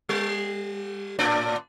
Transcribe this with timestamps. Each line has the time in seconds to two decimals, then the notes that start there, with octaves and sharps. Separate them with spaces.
0.09 G3
1.19 A2 D4 D5